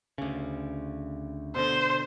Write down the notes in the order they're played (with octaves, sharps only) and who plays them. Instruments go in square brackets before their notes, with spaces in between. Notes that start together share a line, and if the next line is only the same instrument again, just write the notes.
[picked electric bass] D2 C#3
[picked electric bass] B2 D3 [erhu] C5